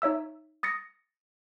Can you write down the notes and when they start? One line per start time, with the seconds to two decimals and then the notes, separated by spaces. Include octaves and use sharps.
0.02 D#4 C#5 E5 E6
0.63 D#6 A6 A#6 C#7